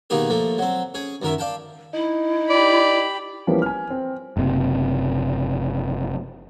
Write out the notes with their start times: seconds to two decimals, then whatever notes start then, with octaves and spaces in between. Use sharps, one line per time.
0.10 B2 D#3 A#3 D#4 G4 G#4
0.30 F3 A3 A#3
0.58 F#3 C4
0.94 C#4 G#4
1.22 F#2 D#3 A#4 E5
1.38 D5 F5 G5 A5
1.94 D#4 E4
2.50 G4 D5 B5
3.47 E3 F3 G3 A#3 B3 C#4
3.62 G#5 F6
3.90 C4
4.37 F#1 C3